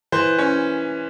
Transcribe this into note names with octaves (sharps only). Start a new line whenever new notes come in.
E3 C5
C#4